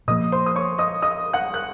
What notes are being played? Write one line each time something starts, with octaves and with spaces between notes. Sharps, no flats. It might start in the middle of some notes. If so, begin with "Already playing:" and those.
A#2 F3 A#3 D#5 D#6
C5 C6
D#6
C#5 C#6
D#5 D#6
D#5 D#6
F#5 F#6
F#6